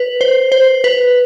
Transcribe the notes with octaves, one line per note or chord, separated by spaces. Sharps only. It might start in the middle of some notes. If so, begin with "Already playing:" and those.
Already playing: B4
C5
C5
B4